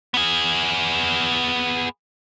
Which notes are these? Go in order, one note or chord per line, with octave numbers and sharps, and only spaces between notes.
B3 G#4